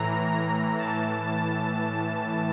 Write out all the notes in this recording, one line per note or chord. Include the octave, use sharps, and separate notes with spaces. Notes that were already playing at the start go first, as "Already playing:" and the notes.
Already playing: A2 E3 A#5
A#5
A2 E3 A5
A5